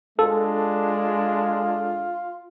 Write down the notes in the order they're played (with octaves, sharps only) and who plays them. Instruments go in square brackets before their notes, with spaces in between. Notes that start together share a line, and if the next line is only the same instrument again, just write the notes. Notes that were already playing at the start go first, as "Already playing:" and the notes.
[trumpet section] G#3 D4 [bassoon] F4 [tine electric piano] A4